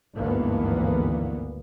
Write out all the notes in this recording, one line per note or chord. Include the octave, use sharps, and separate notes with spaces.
G#1 D2 G2 E3 A#3 B3